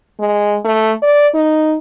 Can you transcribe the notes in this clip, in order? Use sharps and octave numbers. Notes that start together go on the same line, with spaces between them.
G#3
A3
D5
D#4